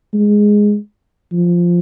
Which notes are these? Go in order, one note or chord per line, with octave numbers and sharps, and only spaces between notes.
G#3
F3